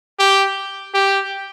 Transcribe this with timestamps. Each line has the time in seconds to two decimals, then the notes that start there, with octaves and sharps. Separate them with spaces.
0.19 G4
0.94 G4